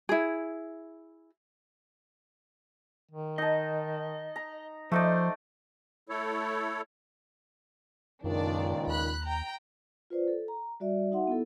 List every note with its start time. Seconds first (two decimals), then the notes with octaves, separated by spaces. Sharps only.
0.09 E4 G#4
3.11 D#3
3.38 D#4 D#5 A5
4.36 A#5
4.92 F3 A3 D#4 C5 D5
6.09 A3 E4 A4 C#5
8.24 C#2 F#2 A#2 D#3 D4 D5
8.87 D#2 B5 F#6
9.25 G5 A#5
10.10 F4 B4 C5 D5
10.28 A4
10.48 A#5
10.80 G3 F#4 D5 E5
11.12 D#4 F#4 E5 F#5 C6
11.27 B3 E4 A4